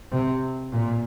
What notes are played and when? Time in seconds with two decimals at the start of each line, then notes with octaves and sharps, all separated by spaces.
0.12 C3
0.72 A#2